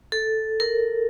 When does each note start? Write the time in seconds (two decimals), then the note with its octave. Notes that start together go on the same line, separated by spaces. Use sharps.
0.12 A4
0.60 A#4